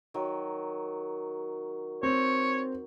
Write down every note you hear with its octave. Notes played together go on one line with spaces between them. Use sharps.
D#3 F#3
C4 C#5